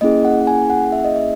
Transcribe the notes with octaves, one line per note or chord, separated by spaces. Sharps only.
A#3 C#4 E4 G#4 D#5
F#5
G#5
F#5
E5
D#5
E5